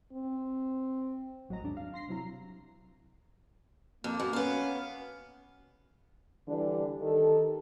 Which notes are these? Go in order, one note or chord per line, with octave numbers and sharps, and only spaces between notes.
C4
A1 F#3 F#4 D#5 A#5
D#2 G#2 D4
F5
C6 A#6 C7
C3 F#3 E4 A#5
F2 A#3
F#2
B3 C#4 F5
D3 E3 G3 D4
D#3 G4 A4